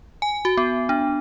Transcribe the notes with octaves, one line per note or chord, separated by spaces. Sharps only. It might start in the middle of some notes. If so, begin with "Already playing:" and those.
G#5
F#4
B3
D4